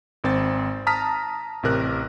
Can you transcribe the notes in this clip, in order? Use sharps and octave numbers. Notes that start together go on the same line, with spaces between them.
G#1 C4 A6
A5 A#5 D#6 F6 B6
A1 C3 A#4 F#6